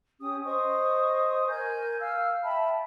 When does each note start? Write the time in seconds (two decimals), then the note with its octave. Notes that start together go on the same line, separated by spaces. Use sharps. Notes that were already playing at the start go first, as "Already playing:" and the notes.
0.20 C#4 G4 D#6
0.45 C5 D#5 C#6 D#6
1.48 A#4 G#5 G6
2.00 F5 E6 F6
2.44 E5 G5 A5 B5